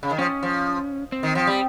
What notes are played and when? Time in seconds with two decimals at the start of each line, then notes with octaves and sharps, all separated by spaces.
0.03 C#3
0.11 D#3
0.18 F3 C#4
0.43 F3
1.12 C4
1.23 D#3
1.35 F3
1.47 G3